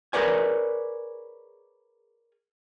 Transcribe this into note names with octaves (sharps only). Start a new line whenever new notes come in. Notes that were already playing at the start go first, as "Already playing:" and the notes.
G#4 A#4 B4 C#5 D5 G#5